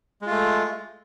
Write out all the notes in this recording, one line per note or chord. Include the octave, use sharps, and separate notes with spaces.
G#3 A3 F4